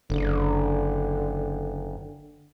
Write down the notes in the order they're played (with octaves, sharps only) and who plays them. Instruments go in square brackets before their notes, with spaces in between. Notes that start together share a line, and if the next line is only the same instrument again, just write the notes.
[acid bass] F#1 [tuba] D3